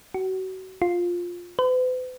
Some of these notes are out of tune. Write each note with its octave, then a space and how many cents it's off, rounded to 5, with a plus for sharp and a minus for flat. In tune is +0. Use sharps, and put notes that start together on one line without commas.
F#4 +30
F4 +10
B4 +45